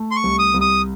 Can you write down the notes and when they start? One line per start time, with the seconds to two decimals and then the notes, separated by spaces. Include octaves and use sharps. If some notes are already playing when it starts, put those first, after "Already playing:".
Already playing: A3
0.11 C6
0.16 C#6
0.24 C2
0.39 D#6
0.54 C2
0.61 D#6